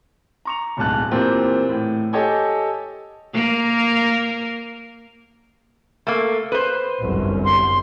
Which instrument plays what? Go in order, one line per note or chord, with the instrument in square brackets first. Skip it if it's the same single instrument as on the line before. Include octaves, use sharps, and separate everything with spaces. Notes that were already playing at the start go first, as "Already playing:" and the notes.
[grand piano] A#5 C#6 F7
D1 B1 G#2 A5 F#6
A#2 E3 C4 F4 G4 A#4
A2
G4 A4 C#5 D#5 G5 G#5
[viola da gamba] A#3 A#4
[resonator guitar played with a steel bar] A3 A#3
B4 C5
[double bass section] G1 C2 F#2
[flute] C6